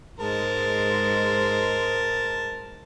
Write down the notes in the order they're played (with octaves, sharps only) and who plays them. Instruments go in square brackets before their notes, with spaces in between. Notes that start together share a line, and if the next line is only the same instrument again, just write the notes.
[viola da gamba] G#2 G#3 C5 [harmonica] A#4 A5